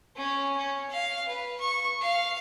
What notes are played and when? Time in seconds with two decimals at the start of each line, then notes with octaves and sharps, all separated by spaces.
0.16 C#4
0.57 C#4
0.90 F5
1.28 B4
1.60 C#6
2.01 F5